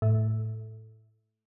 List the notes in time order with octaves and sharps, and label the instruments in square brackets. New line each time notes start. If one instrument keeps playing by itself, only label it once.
[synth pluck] A2